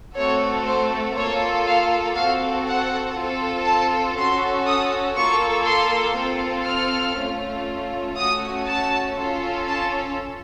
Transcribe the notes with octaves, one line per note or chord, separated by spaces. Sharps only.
A3 C4 F#4 A4 C#5
C5
A#3 F4 A4 C#5
F5
C4 F#4 A4 F5
F#5
C4 F4 A4
A5
C#4 F#4 A4 C6
D#6
A#3 F4 A4 C#6
C6
C4 F4 A4
F6
A3 C#4 F4
A3 C#4 F#4 D#6
A5
C#4 F4 A4
A5